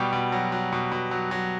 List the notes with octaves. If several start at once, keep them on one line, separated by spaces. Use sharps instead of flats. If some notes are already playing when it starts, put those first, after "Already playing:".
Already playing: B2 G3 G4
B2
F#3
F#3
B2
B2
F#3
F#3